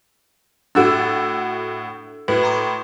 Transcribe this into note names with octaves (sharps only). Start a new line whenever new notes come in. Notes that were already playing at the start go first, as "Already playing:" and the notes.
A2 D4 F#4 A4 E6
A2 F#4 B4
A#5 C6 D6